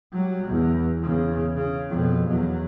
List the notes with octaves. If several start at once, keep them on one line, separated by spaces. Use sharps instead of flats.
F#3 G3
E2
E2 C#3
C#3
F2 B2
E2 F#3